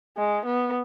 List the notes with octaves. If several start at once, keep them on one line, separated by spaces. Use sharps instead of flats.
G#3
B3